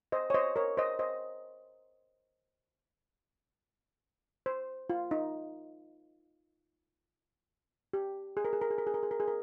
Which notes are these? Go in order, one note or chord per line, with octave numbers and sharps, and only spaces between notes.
C5 D#5
C#5
C5 D#5
A#4 C#5
C5 D#5
C5 D#5
C5
F4
D#4
G4
G#4
A#4
G#4
A#4
G#4
A#4
G#4
A#4
G#4
A#4
G#4
A#4